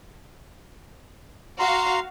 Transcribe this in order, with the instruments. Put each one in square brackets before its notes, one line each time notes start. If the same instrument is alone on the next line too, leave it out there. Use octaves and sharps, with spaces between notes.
[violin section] F#4 F5 [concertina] A#5 C6